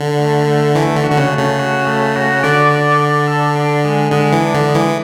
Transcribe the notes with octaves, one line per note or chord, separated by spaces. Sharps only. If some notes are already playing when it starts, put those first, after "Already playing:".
Already playing: D3
A3
A3
E3 A3
D3
F#4
D3
C#3
A3
C#3
F#4
A3
F#4
D3 D5
D5
D5
A4
D4
G#3
D3 G#3
E3
D4
D3
G#3
E3